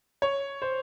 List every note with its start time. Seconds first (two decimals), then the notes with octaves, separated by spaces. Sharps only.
0.22 C#5
0.62 C5